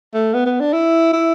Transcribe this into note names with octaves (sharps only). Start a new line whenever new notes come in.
A3
B3
B3
D4
E4
E4